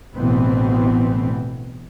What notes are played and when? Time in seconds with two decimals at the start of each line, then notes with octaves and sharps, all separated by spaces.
0.17 A1 D2 B2 E3 B3 C4